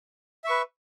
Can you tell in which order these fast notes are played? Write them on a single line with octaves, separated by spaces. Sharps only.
E5 C#6 B4